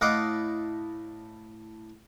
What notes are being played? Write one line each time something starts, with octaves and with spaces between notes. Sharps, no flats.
A2 D#5 F5 F#5 D6